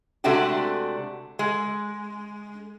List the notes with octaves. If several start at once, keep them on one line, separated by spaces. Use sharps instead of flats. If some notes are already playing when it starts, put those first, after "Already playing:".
C3 G#3 A3 D4 F#4 G4
G#3